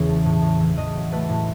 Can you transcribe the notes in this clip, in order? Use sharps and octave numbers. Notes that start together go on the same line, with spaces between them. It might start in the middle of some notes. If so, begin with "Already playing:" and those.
Already playing: E2 C#3 E3 C#5
A3
A2
A2
E3
A2 D#5
F#3
A3 B4
A2